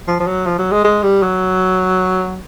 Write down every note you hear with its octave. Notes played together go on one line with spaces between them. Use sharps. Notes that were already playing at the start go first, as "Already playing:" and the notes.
F3
F3
F#3
F3
F#3
G#3
G#3
G3
F#3